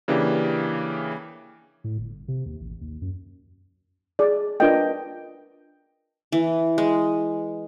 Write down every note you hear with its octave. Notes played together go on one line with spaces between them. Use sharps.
C#3 E3 A#3 D4 G4
A2
G1
C3
D#2
A1
D#2
F#2
G#4 D5
D4 F4 A#4 B4 D#5 G5
E3
G#3